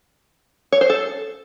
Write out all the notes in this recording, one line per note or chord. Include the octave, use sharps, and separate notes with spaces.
C#5
C5
A4